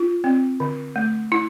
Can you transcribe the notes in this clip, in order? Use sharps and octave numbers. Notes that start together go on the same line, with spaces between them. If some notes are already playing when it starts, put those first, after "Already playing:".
Already playing: F4
C4
D3
A3
E4